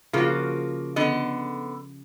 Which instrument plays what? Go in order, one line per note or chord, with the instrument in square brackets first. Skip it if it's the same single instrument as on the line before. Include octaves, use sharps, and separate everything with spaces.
[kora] C#3 F3 F#4 [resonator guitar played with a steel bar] A#3 F4
[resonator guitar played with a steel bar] D3 B3 D#5